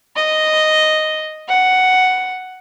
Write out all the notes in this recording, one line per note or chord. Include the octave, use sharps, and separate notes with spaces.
D#5
F#5